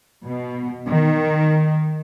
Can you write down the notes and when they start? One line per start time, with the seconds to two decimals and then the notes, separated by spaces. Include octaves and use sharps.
0.25 B2
0.88 D#3